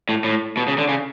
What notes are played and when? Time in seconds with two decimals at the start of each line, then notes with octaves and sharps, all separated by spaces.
0.09 A2
0.24 A2
0.57 B2
0.68 C#3
0.78 D3
0.89 C#3